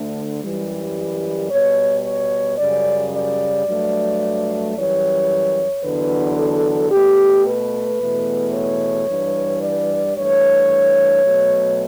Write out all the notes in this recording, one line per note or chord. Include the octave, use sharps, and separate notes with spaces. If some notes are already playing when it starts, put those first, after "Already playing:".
Already playing: D2 D3 A3
F#2 E3 G3
B2 G3 C#5
C#5
F#2 C#3 G3 D5
D5
G2 F#3 A3
F#2 E3 G3 C#5
E2 D3 F#3 B4
A4
B2 A3 G4
B4
E2 B2 A3
C#5
G2 E3 G3
D5
G2 E3 A3 C#5
B2 F#3 A3